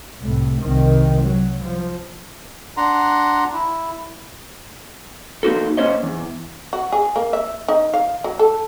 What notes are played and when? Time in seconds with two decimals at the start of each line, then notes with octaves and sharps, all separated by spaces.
0.21 C2 A2
0.60 C2 D#3
1.21 F#3
1.63 F3
2.77 D4 F#5 A#5 C6
3.53 E4
5.43 A#3 D#4 F#4 A4
5.77 A#3 C#4 C5 C#5 D#5
6.03 E2
6.73 F#4
6.92 G#4
7.16 A#3
7.33 E5
7.68 D#4
7.94 F5
8.24 F#3
8.39 A4